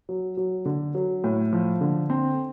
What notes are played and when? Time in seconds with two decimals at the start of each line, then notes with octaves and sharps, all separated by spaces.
0.09 F#3
0.37 F#3
0.65 D3
0.95 F#3
1.24 A2
1.53 F3
1.81 D3
2.10 C4